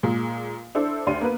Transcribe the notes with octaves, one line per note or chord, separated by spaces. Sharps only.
A#2 G#3
D4 E4 A4 C5
D2 G4 D5 C6 D#7
A#3 B3 A#4 B4